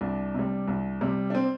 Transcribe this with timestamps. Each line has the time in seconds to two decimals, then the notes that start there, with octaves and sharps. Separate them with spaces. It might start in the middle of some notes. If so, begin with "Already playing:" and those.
0.01 C2 D4
0.34 C3 G3
0.68 C2
1.01 C3 G3
1.30 D4
1.35 C4